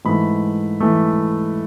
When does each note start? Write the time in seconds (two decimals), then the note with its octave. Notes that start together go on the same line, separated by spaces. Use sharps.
0.05 G#2 E3 A3 B5
0.81 E3 A3